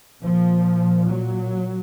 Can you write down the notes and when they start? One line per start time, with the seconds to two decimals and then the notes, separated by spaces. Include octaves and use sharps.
0.22 A#2 F3
1.11 F#3